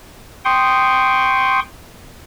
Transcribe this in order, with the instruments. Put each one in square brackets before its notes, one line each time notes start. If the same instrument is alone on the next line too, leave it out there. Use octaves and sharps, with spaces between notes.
[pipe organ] G5 C6 C#6 D#6